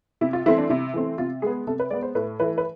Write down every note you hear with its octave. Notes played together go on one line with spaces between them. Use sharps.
C3 E4
F4
E3 A3 C4 E4
D4
C3 E4
E3 A3 C4
C3 F4
G#3 B3 G#4
C3 A4
B4
G#3 B3 D5
C5
A2 B4
E3 A3 B4
B4